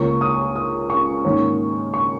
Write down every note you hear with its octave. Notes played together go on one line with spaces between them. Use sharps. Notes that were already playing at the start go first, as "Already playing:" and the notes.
Already playing: C#2 C#3 A#3 C#6
D#6
D#6
C#6
G#2 D#3 A#3 C#4
C#6